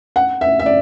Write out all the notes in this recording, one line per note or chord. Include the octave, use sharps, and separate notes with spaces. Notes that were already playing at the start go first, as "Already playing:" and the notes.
F#5
E5
E5
D5